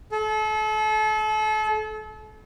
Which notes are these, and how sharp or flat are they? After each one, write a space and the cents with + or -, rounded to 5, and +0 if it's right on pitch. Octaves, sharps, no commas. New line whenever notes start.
A4 -35